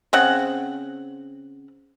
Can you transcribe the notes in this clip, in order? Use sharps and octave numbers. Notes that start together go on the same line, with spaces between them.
C#3 C4 F#5